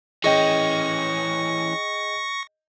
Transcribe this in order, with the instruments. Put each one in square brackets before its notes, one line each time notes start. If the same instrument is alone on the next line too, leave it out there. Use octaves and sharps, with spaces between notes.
[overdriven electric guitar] E3 C#4 [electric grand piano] G#4 D#5 G5 [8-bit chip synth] C#6 A#6